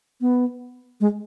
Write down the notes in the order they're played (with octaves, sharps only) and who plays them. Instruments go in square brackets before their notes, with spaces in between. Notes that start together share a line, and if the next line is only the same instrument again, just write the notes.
[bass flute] B3
G#3